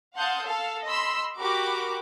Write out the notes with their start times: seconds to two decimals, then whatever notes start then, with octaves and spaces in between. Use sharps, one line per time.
0.16 F5 F#5 A5 C6 D#6 G6
0.45 A4 F5
0.85 D#5 B5 C6 E6
1.39 F#4 G4 A#4 B5 D6